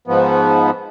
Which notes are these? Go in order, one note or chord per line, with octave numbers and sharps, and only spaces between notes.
G#2 F3 B3